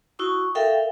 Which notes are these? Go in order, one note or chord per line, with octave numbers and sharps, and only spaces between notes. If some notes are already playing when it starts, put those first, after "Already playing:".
E4 F#4 C#6 D#6
A4 A#4 E5 F5 G5